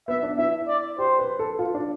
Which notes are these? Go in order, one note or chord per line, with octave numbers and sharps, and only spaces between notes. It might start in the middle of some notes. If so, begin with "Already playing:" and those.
B3 E5
D4
E4 E5
D5
G4 C5
B4
A4
F4
D4